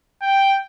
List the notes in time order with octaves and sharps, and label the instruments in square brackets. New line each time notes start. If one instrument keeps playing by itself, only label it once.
[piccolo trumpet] G5